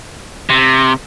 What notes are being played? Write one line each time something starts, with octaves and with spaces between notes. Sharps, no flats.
C3